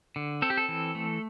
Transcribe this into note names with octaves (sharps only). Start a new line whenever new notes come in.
D3
C4 A4
G4
A4
E3
A3